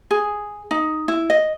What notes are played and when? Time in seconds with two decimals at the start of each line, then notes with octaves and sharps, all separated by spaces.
0.11 G#4
0.71 D#4
1.08 E4
1.30 D#5